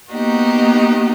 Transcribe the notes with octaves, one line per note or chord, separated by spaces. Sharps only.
A#3 B3 D#4 F#4 G4 D#5